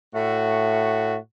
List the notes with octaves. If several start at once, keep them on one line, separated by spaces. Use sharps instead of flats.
A2 A3 F#4